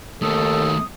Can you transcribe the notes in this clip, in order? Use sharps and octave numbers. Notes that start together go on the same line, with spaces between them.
D#2 D#3 A3 A4 D#6